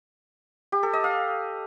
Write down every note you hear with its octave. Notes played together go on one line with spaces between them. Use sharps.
G4
A4
D#5
F5